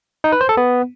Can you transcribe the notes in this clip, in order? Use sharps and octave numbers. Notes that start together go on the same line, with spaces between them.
D#4
B4
C5
A4
B3